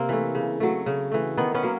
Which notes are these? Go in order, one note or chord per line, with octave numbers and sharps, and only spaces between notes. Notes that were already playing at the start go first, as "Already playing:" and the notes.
Already playing: C3 A#3 C4
E3 A3
C#3
F#3 A3
C#3
E3 A3
D#3 B3
B3 C#4
F#3 A#3